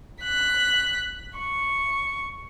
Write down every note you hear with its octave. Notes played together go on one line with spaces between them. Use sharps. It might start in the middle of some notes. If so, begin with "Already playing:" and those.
F#6 B6
C#6